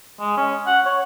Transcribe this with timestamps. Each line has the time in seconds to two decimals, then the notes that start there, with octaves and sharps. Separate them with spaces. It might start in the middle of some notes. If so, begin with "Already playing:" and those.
0.20 G#3
0.37 C#4
0.67 F#5
0.86 C#5